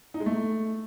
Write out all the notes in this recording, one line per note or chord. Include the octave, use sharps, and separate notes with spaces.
D#4
G#3
A3